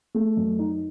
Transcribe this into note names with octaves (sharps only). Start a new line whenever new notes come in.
A3
F#2
D#4